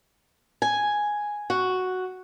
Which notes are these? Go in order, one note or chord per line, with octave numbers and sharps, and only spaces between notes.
G#5
F#4